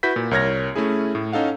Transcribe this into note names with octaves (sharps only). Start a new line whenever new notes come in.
E4 F#4 B4 G6 B6
A#2
C2 A#4 C#5 F6 G#6 A#6
A3 C#4 E4 G#4
A2
C#4 D#4 A4 F5 F#5